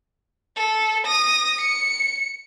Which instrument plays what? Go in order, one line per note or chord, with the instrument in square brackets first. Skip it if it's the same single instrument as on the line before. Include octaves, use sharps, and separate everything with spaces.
[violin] A4
D#6 A#6
C#7